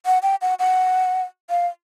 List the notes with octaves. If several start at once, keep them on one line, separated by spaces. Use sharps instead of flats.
F#5
G5
F#5
F#5
F5